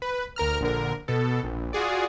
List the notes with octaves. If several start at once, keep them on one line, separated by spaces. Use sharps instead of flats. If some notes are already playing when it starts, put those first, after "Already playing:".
B4
D2 A#4 A#5 F6
A#1 D3 A#4
B2 A4
A#1
F4 F#4 G#4 D5